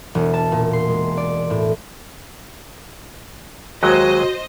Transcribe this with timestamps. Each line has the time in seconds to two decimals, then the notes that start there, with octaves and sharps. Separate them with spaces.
0.15 E1
0.34 A5
0.52 A#2
0.73 C6
0.88 G#3
1.17 D5
1.50 A2
3.83 D#2 F#3 G#3 F#4 C5 D#5